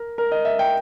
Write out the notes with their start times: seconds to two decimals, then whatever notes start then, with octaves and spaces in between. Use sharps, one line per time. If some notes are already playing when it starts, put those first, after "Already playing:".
Already playing: A#4
0.18 A#4
0.32 D#5
0.45 E5
0.59 G5